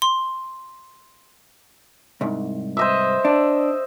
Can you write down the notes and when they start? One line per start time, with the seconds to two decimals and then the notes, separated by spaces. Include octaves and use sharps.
0.02 C6
2.21 C2 G#2
2.77 C5 D#5 E5
3.25 D4